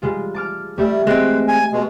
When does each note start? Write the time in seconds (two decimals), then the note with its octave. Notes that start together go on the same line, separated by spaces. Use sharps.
0.02 G3 G#3 F4
0.34 A5 D6 F6
0.78 G3 A3 G4 E5
1.07 G#3 A3 C4 B4
1.48 G#5
1.72 B2 G#3